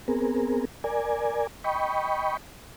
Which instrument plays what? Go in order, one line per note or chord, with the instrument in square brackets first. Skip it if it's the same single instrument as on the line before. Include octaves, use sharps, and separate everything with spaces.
[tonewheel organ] B3 C4 G#4 A#4
A#4 D5 G#5
D#5 G5 B5 C#6